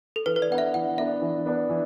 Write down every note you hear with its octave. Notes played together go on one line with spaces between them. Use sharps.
A4
E3 B4
B4
D5
B3 D4 B4 E5 F#5
E3 F#5
B3 D4 B4 E5
E3
B3 D4 B4
E3